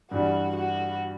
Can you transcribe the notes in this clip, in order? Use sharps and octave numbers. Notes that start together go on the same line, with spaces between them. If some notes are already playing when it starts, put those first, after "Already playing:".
G2 E3 G3 F#4
F#4